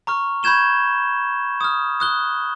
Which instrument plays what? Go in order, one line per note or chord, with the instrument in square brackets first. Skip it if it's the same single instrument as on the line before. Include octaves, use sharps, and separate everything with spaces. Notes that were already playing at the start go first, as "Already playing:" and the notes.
[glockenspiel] A#5 C#6 F6
B5 C#6 G6 G#6 E7 G7
D#6 F6
D#6 F#6 G7